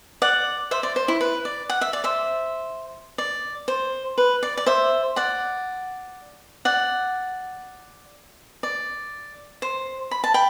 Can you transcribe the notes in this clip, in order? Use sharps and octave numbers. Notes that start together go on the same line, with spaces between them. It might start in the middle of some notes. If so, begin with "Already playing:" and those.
D5 F#5
C5 E5
D5
C5
E4
B4
D5
F#5
E5
D5
C5 E5
D5
C5
B4
D5
D5
C5 E5
D5 F#5
D5 F#5
D5
C5
B5
A5
G5 B5